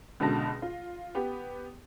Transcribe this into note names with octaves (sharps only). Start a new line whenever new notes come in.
C#2 B2 D3 A5 A#6
F4
B3 G4